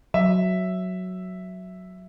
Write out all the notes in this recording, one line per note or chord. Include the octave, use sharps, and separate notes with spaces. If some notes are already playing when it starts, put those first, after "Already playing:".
F#3 E5